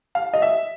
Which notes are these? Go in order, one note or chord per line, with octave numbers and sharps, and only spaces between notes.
F5
D#5
E5